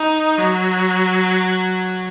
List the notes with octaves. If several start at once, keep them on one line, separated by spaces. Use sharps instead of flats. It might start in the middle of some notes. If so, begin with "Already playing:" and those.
Already playing: D#4
F#3